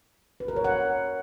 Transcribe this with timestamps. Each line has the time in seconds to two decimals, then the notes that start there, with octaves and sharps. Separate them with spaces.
0.40 B4
0.48 A#4
0.56 C#5
0.64 F#5